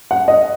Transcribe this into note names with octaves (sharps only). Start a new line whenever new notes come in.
F#5
D#5